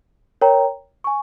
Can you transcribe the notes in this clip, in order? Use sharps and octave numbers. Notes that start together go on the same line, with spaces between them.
A#4 C#5 G5 A#5
G#5 C#6